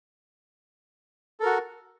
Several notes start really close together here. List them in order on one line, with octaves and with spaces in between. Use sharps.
A4 A#4 F#4